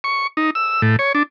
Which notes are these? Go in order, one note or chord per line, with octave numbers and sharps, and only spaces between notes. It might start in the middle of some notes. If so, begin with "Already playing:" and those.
C#6
D#4
E6
A2
C#5
D4